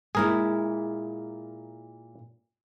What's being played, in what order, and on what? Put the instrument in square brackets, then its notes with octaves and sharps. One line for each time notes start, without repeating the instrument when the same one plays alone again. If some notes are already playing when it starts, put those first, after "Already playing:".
[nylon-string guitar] A#2 G#3 E4 [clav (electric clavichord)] G#4 A#4